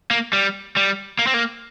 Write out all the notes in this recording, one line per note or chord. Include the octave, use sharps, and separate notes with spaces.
A#3
G3
G3
A#3
C4
A#3